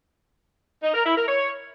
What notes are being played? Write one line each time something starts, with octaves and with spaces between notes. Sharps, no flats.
D#4
A#4
E4
A#4
C#5